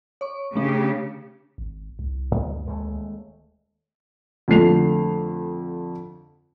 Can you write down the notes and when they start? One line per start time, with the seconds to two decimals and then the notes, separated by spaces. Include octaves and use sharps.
0.21 C#5 C#6
0.55 C#3 A3 D4 G4
1.58 G#1
1.99 C2
2.31 D2 G2
2.66 D#1 G#3 A3
4.48 F2 D3 A3 C7 F7